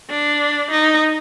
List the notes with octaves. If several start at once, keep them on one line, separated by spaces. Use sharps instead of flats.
D4
D#4